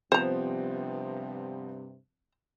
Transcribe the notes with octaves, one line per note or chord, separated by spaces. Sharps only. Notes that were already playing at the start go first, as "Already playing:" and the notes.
G2 C3 F3 B3 C4 C5 A#5